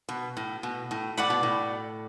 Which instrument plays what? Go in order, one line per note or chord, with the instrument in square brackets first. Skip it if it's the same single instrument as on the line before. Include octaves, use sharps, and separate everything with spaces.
[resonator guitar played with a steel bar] B2
A2
B2
A2
[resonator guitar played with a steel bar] A2 [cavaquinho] D5 F#5 B5
[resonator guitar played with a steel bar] B2
A2